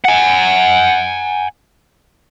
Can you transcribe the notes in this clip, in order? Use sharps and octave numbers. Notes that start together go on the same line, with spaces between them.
F#5 G#5